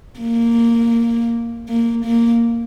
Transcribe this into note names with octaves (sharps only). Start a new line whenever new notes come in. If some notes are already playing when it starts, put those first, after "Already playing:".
A#3
A#3
A#3